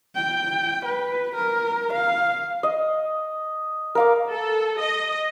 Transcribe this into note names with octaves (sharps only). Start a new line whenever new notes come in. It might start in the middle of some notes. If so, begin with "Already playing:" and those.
G5
B4
A#4
F5
D#5
A#4 F5 D6
A4
D#5